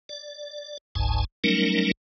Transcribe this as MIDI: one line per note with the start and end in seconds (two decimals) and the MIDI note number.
0.09 0.78 74
0.95 1.24 31
0.95 1.24 37
0.95 1.24 44
0.95 1.24 80
0.95 1.24 81
1.44 1.91 54
1.44 1.91 55
1.44 1.91 57
1.44 1.91 61
1.44 1.91 63
1.44 1.91 70